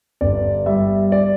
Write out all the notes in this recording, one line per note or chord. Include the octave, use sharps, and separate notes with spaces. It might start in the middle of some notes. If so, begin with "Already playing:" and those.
G1 D5
G3 E5
D5